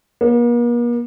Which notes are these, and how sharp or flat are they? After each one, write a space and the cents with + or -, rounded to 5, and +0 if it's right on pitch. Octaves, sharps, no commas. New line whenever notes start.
A#3 +45